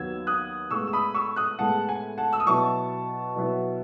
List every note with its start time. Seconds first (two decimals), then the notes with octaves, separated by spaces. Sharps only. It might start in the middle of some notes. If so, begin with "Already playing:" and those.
Already playing: D#2 D#3 F#3 B3 E6 G#6
0.27 D#6 F#6
0.71 A2 G#3 B3 C#6 E6
0.87 E6
0.93 B5 D#6
1.14 C#6 E6
1.36 D#6 F#6
1.59 A2 G#3 B3 F#5 A5
1.89 G#5
2.18 F#5 A5
2.33 E6
2.40 D#6
2.47 B2 F#3 B3 E4 A5 C#6
3.36 B2 F#3 B3 E4